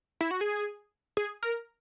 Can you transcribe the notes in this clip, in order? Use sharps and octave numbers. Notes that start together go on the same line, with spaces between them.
E4
F#4
G#4
G#4
A#4